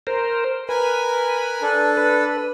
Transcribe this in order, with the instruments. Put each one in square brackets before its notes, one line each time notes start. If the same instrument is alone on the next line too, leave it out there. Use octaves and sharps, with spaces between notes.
[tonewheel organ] A#4 C5
[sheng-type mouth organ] A#4 G#5 [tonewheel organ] B4
[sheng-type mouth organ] D4 A4
[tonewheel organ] B4